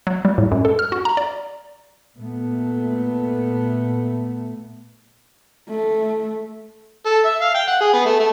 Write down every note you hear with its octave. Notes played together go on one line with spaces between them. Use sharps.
F#3
G3
A2
F#2
A4
F6
F#4
A#5
D5
A#2 A3 B3
A3
A4
E5
F5
G5
F#5
G#4
B3
A3
A3